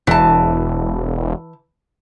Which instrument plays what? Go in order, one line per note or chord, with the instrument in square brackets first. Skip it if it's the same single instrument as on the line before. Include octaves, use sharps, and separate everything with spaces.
[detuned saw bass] E1 [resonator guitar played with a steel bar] E3 A5